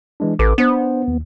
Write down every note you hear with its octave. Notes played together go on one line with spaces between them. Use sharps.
E3 G#3 D4
A1 A4 B4 D6
B3 D4 C5
D#2